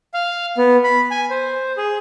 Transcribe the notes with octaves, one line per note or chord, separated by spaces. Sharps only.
F5
B3
B5
G#5
C5
G#4